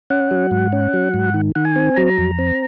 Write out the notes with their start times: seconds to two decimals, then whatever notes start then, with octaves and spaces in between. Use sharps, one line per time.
0.10 C#4 F#5
0.31 F#3
0.51 G#2
0.72 C#4
0.93 F#3
1.14 G#2
1.34 D#3
1.55 D#3 F#5
1.65 G#5
1.76 C4
1.96 F#3 A#5
2.18 F2
2.39 C4